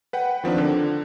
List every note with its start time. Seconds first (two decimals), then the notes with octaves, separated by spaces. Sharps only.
0.13 B4 F#5 G5
0.44 D#3 F3 C4 D4
0.58 D3